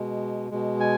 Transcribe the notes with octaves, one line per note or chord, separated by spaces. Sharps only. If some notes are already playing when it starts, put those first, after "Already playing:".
Already playing: B2 G#3
B2 G#3
G#5